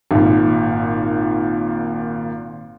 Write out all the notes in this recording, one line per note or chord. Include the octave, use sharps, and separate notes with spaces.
G#1 A#2